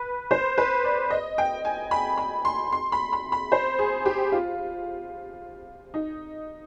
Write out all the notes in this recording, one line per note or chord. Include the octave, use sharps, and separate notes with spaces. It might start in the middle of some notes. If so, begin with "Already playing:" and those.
Already playing: B4
C5
B4
D5
D#5
G5
G#5
B5
B5
C6
C6
B5
B5
B5
C5
G#4
G4
F4
D#4